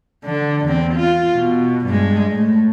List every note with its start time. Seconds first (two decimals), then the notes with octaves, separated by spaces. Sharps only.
0.25 D3
0.66 E2 C4
0.94 F4
1.33 B2
1.87 G2 G#3
2.31 A2